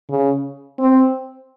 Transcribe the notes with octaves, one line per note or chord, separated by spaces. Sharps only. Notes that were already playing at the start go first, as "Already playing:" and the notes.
C#3
C4